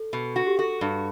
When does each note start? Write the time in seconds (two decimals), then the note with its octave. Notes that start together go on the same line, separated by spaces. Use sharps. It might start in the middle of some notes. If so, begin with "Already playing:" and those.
Already playing: A4
0.13 B2
0.36 F#4
0.47 G4
0.58 F#4 A4
0.81 G2